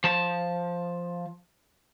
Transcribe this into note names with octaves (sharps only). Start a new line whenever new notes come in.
F3 A5